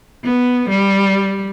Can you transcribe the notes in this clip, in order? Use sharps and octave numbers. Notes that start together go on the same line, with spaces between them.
B3
G3